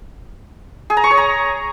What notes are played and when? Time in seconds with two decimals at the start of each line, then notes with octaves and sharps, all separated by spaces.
0.90 G#4
0.97 A#5
1.04 C#6
1.11 C#5
1.18 A#5